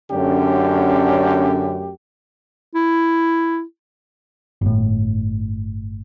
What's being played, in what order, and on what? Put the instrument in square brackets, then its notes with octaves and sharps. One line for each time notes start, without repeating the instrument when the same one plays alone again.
[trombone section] F#2 A3 G4 [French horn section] D3 C#4 D4
[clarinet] E4
[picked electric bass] G1 A2